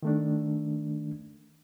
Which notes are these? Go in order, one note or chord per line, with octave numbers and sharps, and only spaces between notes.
D#3 A3 D4